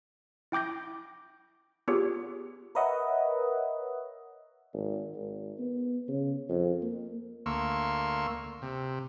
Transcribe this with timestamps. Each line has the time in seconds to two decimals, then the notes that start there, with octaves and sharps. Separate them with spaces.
0.52 E4 G5 D6 G6 A#6
1.88 B3 F4 G4 G#4 C#5
2.75 A#4 B4 C#5 D#5 E5 F#5
4.74 G#1
5.15 G#1
5.59 B3
6.08 C#3
6.49 F2
6.83 A#3
7.46 D2 A#3 C6 C#6 E6
8.62 C3